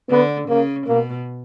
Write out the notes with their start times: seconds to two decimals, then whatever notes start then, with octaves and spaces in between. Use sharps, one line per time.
0.10 D3 B3
0.49 C#3 A#3
0.87 B2 A#3